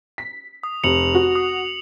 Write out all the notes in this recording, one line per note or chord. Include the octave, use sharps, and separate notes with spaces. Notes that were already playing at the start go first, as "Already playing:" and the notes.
B6
D#6
F1 C#7 F7 F#7
F#4
D#6